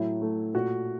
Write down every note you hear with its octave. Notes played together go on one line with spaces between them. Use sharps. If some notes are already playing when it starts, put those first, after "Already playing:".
Already playing: A2 F#3 E4
A3
A#2 F#4